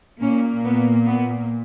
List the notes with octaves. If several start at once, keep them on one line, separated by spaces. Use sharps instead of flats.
A#2 A#3 C#4
B3
B3